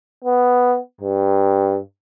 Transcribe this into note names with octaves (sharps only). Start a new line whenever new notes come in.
B3
G2